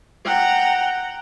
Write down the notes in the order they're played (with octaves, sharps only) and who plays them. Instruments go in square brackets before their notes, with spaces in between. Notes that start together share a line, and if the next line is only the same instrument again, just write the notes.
[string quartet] F#5 G5 A#5